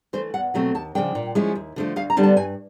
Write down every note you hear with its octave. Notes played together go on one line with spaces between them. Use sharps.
E3 A3 C5
E2 F#5
B2 F#3 A3 C4
D#2 A5
C#3 F3 A3 D4 G5
A#2
F3 G#3 C#4 E4
D#2
D3 F3 A3
D2 F5
A#5
D3 G3 B3 D4
A5
G2 G#5